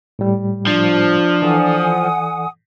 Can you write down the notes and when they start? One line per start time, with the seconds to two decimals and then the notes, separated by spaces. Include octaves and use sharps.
0.19 A2 G3
0.67 F3 D4
1.42 E3 A4 D5 F#5 G#5 D#6